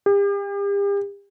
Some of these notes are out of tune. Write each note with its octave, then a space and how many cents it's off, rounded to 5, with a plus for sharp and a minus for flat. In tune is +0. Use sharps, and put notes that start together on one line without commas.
G4 +40